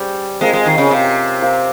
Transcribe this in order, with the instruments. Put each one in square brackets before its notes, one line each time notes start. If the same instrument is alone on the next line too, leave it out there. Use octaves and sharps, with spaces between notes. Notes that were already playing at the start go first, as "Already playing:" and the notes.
Already playing: [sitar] G3 [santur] C#4 G#4 C5
[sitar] G#3 [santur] C4 F4 A#4
[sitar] G#3
D#3
C#3
C3
[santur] C4 F4 A#4 F5